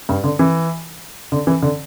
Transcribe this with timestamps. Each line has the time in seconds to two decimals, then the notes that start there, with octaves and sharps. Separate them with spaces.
0.09 G2
0.24 D3
0.39 E3
1.32 D3
1.47 E3
1.62 D3